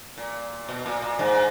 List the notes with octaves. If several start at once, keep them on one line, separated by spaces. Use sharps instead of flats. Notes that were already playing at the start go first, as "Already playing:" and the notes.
A#2
B2
A#2
A#2
G#2